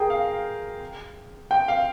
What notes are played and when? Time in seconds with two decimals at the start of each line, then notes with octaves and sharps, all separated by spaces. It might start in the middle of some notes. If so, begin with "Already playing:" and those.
Already playing: G#4 A#4 G5
0.10 F5
1.51 G5
1.68 F5